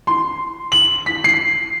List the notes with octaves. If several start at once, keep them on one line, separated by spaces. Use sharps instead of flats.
C6
F#7
B6
C7